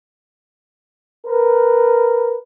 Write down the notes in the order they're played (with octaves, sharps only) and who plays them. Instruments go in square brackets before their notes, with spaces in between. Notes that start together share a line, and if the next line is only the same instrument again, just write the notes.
[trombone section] A#4 B4